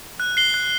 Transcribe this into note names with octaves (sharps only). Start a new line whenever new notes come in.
F#6
C7 G7
F#6